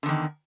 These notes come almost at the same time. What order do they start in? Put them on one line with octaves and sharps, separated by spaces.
D3 E2 D#3